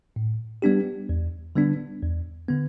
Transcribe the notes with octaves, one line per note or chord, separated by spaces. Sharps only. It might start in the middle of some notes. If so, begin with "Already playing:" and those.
A2
G3 B3 D4 G4
E2
D3 G3 B3 D4
E2
D3 B3